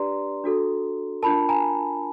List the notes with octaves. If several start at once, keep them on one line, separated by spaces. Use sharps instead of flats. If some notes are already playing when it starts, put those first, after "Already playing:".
Already playing: D4 G4 B4 D5 A#5 C6
D4 F#4 A4
D4 F4 A#4 A5 B5
G#5 A#5